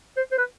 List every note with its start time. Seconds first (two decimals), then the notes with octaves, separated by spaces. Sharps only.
0.17 C5
0.32 C5
0.38 B4